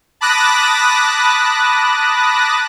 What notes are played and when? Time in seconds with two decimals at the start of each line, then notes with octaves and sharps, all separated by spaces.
0.21 A5 B5 D6 D#6 F#6 A#6